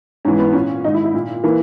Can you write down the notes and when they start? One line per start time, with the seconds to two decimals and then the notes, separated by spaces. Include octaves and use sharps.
0.25 G#2 E3 C#4
0.39 B3
0.53 A#2 C#4
0.84 G#2 D#3 D#4
0.94 E4
1.04 E4
1.14 A#2
1.44 E3 A#3